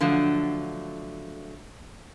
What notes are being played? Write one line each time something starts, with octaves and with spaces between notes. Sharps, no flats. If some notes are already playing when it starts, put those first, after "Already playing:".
D3 F3 F#3 A3